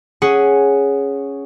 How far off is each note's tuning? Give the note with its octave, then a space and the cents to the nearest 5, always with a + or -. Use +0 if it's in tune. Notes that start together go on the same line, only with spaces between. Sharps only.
C#4 +0 G#4 +0 F#5 +0